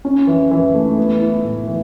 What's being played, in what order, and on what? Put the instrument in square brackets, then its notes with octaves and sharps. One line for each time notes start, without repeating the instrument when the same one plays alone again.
[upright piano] C#4
E3
E3
A3
B3
E4
A2
E3